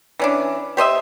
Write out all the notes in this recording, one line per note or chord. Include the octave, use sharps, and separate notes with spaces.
E3 C#4 D4
G4 C5 D#5 E5